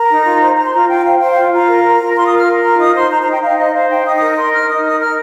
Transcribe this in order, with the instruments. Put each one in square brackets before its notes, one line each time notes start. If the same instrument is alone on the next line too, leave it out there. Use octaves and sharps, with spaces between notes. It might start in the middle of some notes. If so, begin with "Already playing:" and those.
Already playing: [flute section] A#4 A#5
D#4
F4
C5
C5 A#5
C6
F4 A#5
F4 G5
C5 F5
C5 G5
F5
F4
F4 A#5
A#4
A#4
F4
F4 C6
D#6
A#4
F6
A#4
F4 A#5
D#4 D#6
C5 C6
C5 A#5
A#5
D#4
G5
D#4 F5
C5 D#5
C5 F5
D#4 G5
D#4 D#6
D#6
A#4
A#4 C6
D#4 F6
D#4 D#6
A#4 D#6
A#4 F6